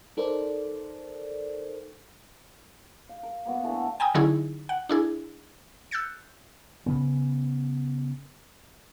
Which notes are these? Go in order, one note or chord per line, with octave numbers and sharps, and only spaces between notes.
D#4 A4 A#4 C5 D5
F5
A#4
A#3 B3 F#4
E3 A3 B3 D4
G5 G#5 A#5 D#6
D3 F#3 C#4 D#4 E4 G#4
F#5
D4 E4 G#4
E6 F#6 G6 A6 C#7
C#3 B3